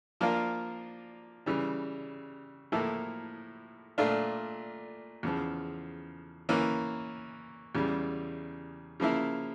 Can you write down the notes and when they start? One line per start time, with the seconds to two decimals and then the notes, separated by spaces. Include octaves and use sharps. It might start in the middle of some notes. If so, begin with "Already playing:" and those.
0.21 F3 A#3 D4 F4 A#4
1.46 C#3 E3 G3
2.72 A2 F3 A#3 E4 A4
3.98 A#2 A3 D4 F4
5.23 E2 C#3 F3
6.49 E3 A#3 C#4
7.75 E2 C#3 G3
9.00 C#3 F3 A#3 E4